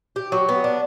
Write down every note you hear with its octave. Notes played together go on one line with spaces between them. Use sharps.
G4
F#3
B3
D4